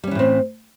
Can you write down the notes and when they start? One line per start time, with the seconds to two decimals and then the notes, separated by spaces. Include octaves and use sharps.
0.04 G3
0.07 C#4
0.11 E3
0.15 A2
0.19 C4